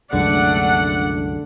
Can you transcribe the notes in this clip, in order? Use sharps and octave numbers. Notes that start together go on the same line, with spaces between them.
C2 F#2 D3 G#3 A3 D4 D5 F#5